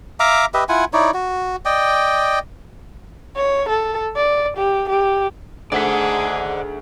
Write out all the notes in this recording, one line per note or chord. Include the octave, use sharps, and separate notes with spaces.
E5 F5 A#5 D6
G4 B4 D#5 E5
E4 F4 F#5 G#5
D#4 E4 C#5 D5
F#4
D5 D#5 G5
C#5
A4
D5
G4
G4
D2 G#2 G#4 D5 F#5 B6